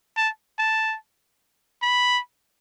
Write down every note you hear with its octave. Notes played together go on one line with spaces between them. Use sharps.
A5
A5
B5